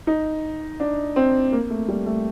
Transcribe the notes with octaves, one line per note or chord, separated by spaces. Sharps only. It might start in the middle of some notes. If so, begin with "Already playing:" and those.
D#4
D4
C4
A#3
A3
G3
A3